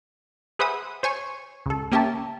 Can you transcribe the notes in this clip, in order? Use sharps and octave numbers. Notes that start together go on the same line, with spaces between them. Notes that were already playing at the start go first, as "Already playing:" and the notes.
G#4 B4 C5 E5 F#5 D#6
C5 C#5 G#5 C#6
C#2 A4
A#3 C#4 G4 A#4 E5 A5